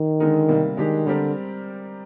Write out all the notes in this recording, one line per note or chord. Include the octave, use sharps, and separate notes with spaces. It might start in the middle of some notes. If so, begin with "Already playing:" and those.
Already playing: D#3
D3 G#3 D#4 A#4
C3 G3 A#3
D#3 G#3 D4 G4
D3 G3 C4 G4 A#4 D5